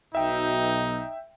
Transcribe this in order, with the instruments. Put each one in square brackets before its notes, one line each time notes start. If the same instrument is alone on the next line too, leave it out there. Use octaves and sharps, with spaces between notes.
[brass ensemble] B1 B2 [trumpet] D#4 [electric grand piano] E5 G5